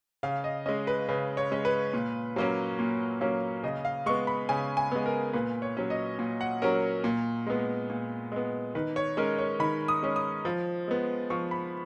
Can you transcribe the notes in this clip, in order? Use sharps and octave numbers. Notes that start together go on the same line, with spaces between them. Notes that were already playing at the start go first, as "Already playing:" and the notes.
C#3 F5
D#5
G#3 C#4 D#5
B4
C#3 B4
C#5
G#3 C#4
B4
A#2
F#3 A#3 C#4
A#2
F#3 A#3 C#4
C#3 D#5
F5
G#3 B3 C#6
B5
C#3 G#5
G#5
G#3 B3
A#4
A#2 B4
C#5
F#3 C#4
D#5
A#2
F#5
F#3 C#4 A#4
A#2
G#3 B3
A#2
G#3 B3
D#3 B4
C#5
G#3 C#4 A#4
C#5
D#3 B5
D#6
G#3 C#4
D#6
F3
G#3 B3
F3 C#6
B5